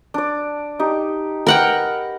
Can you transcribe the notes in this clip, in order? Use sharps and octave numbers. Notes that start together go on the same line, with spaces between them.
D4 D5
D#4 G4
A#4 B4 F#5 G5